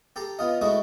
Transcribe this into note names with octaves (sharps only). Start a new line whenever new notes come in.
G4 A4 A#5 C6
B3 F4 D#5
G#3 A3 E4 F#4 D#5